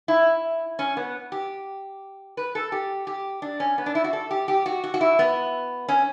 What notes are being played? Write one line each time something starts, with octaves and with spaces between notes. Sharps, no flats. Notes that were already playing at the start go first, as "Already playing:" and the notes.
E4
C#4
B3
G4
B4
A4
G4
G4
D4
C#4
B3
D4
E4
F#4
A4
G4
G4
F#4
F#4
F#4
E4
B3
C#4